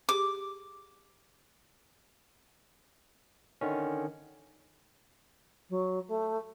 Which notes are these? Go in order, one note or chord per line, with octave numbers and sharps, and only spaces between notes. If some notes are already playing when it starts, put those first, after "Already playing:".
G4 G#4 D6
D3 D#3 C#4
F#3
A3